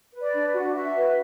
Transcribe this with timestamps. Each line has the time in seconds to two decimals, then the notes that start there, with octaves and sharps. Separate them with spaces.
0.13 B4
0.21 D5
0.34 D4
0.53 F#4
0.74 F#4 E5
0.95 B4